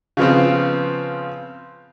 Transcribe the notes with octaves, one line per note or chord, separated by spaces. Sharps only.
C#3 F3 B3 C4